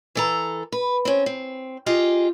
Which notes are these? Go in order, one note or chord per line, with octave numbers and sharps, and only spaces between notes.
E3 A4 A#5
B4
C4 C#4
C4
F4 G4 G#4 D#5